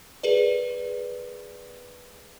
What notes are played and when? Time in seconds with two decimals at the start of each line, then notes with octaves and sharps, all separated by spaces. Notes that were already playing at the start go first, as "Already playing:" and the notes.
0.23 G#4 A#4 B4 D5